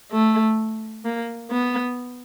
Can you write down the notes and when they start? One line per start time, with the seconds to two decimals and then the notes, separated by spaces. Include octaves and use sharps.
0.12 A3
1.05 A#3
1.50 B3